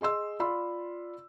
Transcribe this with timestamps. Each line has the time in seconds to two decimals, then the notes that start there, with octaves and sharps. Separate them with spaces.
0.01 G#4 D#5 C6 E6
0.40 F4 D5 B5 C6 E6